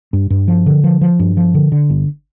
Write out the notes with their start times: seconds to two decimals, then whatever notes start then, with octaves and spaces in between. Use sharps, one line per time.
0.13 G2
0.30 G2
0.48 F3
0.66 D3
0.84 F3
1.01 F3
1.19 G2
1.37 F3
1.54 D3
1.72 D3
1.89 G1